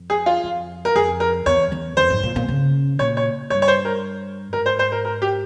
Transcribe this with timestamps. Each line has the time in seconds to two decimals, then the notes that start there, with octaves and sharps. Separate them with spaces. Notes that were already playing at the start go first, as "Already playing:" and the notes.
Already playing: F2
0.10 G#4
0.26 F4
0.44 F2
0.85 A#4
0.95 F2 G#4
1.20 A#4
1.46 E2 C#5
1.72 E2
1.97 F2 C5
2.10 G#2
2.23 A#2
2.36 A#2
2.48 C#3
2.99 A#2 C#5
3.17 C#5
3.50 G2 C#5
3.62 C#5
3.68 C5
3.85 A#4
4.53 G#2 A#4
4.66 C5
4.79 C5
4.92 A#4
5.05 A#4
5.22 G4